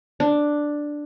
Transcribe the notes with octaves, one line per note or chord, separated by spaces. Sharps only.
D4